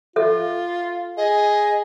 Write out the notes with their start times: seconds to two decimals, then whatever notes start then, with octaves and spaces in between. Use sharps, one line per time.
0.16 F4 A4 E5
1.17 G#4 D#5